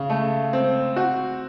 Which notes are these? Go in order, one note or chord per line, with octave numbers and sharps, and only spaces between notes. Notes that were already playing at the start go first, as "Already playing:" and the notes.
Already playing: C#3
A3
C4
F#4